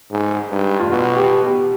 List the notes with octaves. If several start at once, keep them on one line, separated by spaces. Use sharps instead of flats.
G#2
G2
F4
B2 F#4
G4
G4